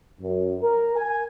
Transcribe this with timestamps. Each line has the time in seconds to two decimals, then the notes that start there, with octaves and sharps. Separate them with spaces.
0.21 F#2
0.62 A#4
0.96 G#5